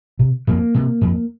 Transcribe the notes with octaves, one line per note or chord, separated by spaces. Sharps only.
C3
F2 A#3
C3
F2